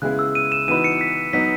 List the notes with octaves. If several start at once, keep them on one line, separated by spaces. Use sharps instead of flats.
C#3 G#3 B3 E4 G#4 F#6
E6
D#7
E7
E3 B3 D#4 F#4 B4 D#7
C#7
B6
F#3 B3 D#4 B6